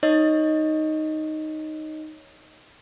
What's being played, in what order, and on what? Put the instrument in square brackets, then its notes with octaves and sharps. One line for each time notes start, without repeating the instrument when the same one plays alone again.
[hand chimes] D#4 C#5 D#5